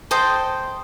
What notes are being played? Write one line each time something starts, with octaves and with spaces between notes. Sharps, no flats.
A4 C5 D#5 G5